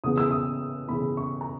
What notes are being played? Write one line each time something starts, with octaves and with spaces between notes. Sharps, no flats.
C#3 E3 B3 D#6
E6
D#6
C#3 E3 B3 B5
C#6
A#5